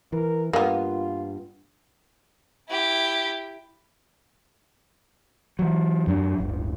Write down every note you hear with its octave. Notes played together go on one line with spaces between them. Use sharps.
E3 A#4
G2 A#3 B3 F4
E4 G4
E3 F#3
F#2 F#3 D4
D1 G1